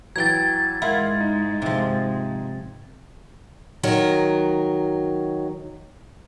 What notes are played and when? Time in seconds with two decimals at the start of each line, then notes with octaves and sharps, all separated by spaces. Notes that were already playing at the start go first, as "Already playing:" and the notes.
0.16 E3 F#3 G5 A#5 G#6 A6
0.82 G#2 G#3 E4 F4 A#4 F5 F#5
1.20 D#4
1.62 C3 F3
3.83 D#3 F#3 A#4